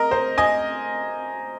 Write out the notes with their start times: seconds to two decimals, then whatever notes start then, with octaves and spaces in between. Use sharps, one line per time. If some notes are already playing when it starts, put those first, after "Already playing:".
Already playing: A#4 D#5
0.11 C5
0.38 D#5 G#5